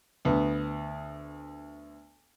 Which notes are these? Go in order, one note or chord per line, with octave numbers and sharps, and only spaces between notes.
D2 B3